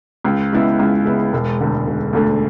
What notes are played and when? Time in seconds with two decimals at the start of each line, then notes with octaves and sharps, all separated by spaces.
0.24 C#2
0.53 C#3 G#3 B3 E4
0.79 C#2
1.05 C#3 G#3 B3 E4
1.33 E1
1.60 D2 D3 A3
1.87 E1
2.13 D2 D3 A3